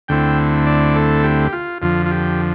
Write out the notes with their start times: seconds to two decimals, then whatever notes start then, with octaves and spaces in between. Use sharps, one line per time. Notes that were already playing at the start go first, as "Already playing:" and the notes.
0.08 D2 D3 A3 C4 E4 G5
0.67 D5
0.96 A4
1.24 G4
1.53 F4
1.82 F2 D3 F3 F4
2.06 F4
2.11 G4